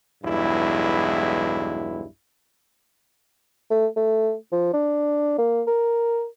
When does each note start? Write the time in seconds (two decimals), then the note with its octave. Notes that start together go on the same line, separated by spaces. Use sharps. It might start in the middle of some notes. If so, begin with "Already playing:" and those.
0.24 B1 E2 G2 G#3 E4
3.70 A3
3.96 A3
4.52 F3
4.73 D4
5.38 A#3
5.67 A#4